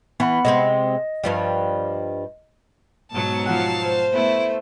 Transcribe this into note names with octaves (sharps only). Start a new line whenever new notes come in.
E3 B3 F#5 B5
C3 G#3 C4 D#5
G2 F3 G3
G#2 B2 F#3 A5
F3 F5 F#5 A5
C5
A3 B3 E4